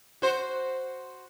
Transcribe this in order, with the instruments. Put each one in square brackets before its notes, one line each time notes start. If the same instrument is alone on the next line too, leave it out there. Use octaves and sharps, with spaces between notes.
[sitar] F#4 C5